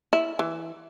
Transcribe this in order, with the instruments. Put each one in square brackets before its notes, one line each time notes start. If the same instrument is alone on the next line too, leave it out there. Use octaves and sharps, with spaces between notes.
[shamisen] E4
E3